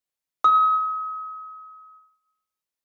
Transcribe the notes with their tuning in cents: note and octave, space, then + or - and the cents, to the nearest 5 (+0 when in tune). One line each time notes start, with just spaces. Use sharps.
D#6 +40